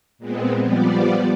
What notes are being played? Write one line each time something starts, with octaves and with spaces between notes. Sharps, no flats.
A#2 G#3 B3 C4
F3 G3 B3 D5